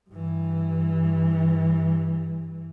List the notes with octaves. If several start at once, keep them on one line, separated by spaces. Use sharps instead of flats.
G2 E3